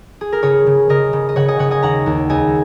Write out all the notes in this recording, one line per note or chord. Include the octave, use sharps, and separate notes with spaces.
G#4
A#4
C#3 G#4 C#5
C#3
C#3 A#4 D#5
C#3
D#5
C#3 C#5 F#5
D#5 G#5
C#3 C#5 F#5
D#5 G#5
D#2 F#5 A#5
D#2
C#2 D#5 G#5